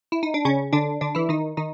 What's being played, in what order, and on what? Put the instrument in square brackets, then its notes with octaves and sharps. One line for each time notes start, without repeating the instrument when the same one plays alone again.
[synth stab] E4
D#4
D4
C#3 C#4
D3 D4
D3 D4
E3 E4
D#3 D#4
D#3 D#4